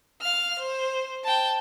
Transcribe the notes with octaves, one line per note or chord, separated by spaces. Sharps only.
F5 F6
C5
G5 A5